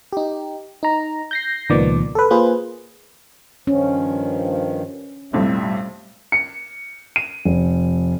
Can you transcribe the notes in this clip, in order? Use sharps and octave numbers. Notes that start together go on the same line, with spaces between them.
D#4 G4
D#4 A#5
G6 A#6 C7
C#2 A#2 D#3 F3 B3 D5
A4 B4
A#3 F4 G#4 B4 C5
G2 D#3 F3 C#4
B1 F2 A2 G3 E5
C#7
D#7
F1